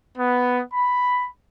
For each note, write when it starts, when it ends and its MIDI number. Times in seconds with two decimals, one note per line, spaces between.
0.17 0.60 59
0.73 1.26 83